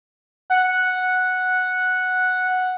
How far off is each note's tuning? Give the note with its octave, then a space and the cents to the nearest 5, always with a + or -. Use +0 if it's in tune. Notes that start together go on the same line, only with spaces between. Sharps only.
F#5 -5